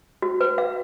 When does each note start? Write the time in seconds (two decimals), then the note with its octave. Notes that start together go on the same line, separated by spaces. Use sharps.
0.22 F#4
0.41 B4
0.58 F5